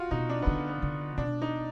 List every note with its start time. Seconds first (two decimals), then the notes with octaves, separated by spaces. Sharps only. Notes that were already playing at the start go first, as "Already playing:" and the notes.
Already playing: F4 F#4
0.11 B2 D#4
0.29 D4
0.42 D3 B3
0.69 B3
0.82 D3
1.18 B2 D4
1.42 D#4